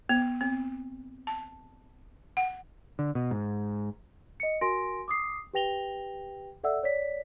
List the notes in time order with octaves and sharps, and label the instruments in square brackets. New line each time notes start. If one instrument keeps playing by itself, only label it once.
[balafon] B3
C4
A5
F#5
[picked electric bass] D3
B2
G#2
[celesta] D#5 C#7
F#4 A#4 G#5 C6 A#6 D7
D6 D#6 C7
G4 B4 G5 A#6 F7 G7
A4 D5 E5 F#5 E6
C#5 D5 B6